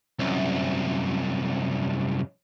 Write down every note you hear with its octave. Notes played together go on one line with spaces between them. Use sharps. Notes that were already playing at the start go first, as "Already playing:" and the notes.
C2 F#2